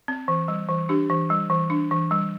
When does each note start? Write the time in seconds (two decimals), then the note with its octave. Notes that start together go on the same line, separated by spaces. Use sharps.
0.08 C4
0.28 E3
0.48 G3
0.68 E3
0.89 D4 G4
1.10 E3
1.30 G3
1.50 E3
1.70 D4
1.91 E3
2.11 G3